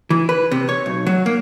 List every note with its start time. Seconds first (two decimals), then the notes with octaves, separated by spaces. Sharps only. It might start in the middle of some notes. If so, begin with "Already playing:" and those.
0.10 E3
0.29 B4
0.51 C3
0.69 C#5
0.86 B1
1.07 F#3
1.26 A#3